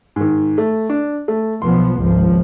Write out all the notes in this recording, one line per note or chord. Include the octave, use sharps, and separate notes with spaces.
G#2 D#3
A3
D4
A3
B1 F3 B3 C6
G#1 C#2 F3